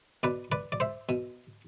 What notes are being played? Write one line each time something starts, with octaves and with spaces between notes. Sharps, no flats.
B2 B4 D5
B4 D5
D5
C5 E5
B2